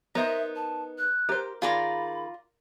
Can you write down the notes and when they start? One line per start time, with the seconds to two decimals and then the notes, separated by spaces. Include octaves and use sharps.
0.15 B3 D#4 A#4 C5 E5 A#5
0.56 A5
0.98 F#6
1.29 G4 A#4 C5
1.62 D#3 F4 G#4 D5 A#5 B5